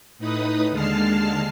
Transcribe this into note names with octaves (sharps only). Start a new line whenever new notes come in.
A2 D#4 B4 D#6
D#2 D3 G#3 A5 F6 C7